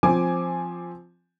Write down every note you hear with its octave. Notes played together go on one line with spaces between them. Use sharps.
F3 C4 G#5 D6